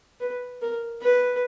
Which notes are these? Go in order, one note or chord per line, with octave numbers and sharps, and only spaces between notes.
B4
A#4
B4